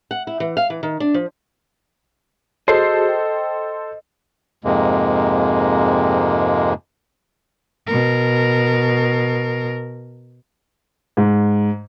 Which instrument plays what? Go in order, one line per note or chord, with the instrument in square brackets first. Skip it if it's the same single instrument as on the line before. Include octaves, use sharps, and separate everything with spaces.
[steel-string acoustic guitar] F#5
E4
E3
F5
E3
D#3
D4
F3
[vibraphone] F#4 G#4 [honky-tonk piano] A4 C5 C7 [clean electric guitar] D#5
[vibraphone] G5
[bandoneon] F2 G#2 C3 G#3 A#3
[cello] B2 A#4
[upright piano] G#2